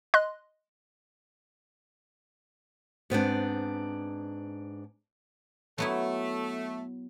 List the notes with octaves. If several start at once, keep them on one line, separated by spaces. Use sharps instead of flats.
D#5 C6 F#6
G#2 B3 C4 D4
F#3 A3 B3 E4